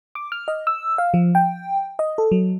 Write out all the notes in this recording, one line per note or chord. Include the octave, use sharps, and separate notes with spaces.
D6
F6
D#5
E6
F5
F3
G5
D#5
A4
F#3